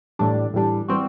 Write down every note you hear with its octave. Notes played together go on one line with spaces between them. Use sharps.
A2 E3 G3 D4
A2 E3 G3 D4
E3 G3 C4 F#4